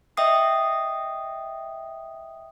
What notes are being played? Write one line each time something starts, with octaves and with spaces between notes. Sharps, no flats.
D#5 E5 G5 D#6 C7